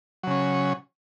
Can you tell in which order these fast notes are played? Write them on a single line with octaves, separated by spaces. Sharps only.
F#3 C#3 C#4